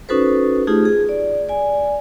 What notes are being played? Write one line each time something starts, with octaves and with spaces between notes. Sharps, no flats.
C#4 D#4 F#4 A4 B4 C5
A3 D#4 F4 G4 G#4
G#4
D5
D5 G#5